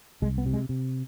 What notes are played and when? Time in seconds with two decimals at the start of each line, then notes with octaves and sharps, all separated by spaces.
0.22 C2 G#3
0.38 B3
0.46 C3
0.54 G#3
0.69 C3